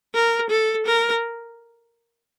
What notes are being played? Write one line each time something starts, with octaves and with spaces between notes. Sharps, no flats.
A#4
A4
A#4